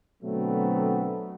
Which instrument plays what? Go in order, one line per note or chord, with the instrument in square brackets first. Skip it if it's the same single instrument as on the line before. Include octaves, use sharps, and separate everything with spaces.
[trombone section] B2 D3 F#3 A3 B3 C4